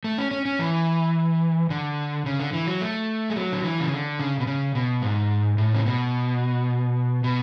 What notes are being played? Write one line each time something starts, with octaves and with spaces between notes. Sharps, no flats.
A3
C#4
C#4
C#4
E3
D3
C#3
D3
E3
F#3
A3
G#3
F#3
D3
E3
C#3
D3
C#3
B2
C#3
B2
G#2
A2
C#3
B2
B2